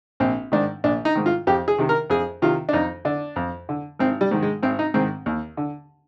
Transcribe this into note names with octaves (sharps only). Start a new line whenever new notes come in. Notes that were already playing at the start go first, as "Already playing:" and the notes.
A#1 C4
G#2 D#3 D4
A#1 D4
D#4
G#2 D#3
F4
F2 G4
G#4
C3 D#3
A#4
F2 G#4
C3 D#3 F4
D4
F2 D#4
D3 D4
F2
D3
G#1 C4
G3
G#2 D#3
G#3
G#1 C4
D#4
G#2 D#3 C4
D#2
D3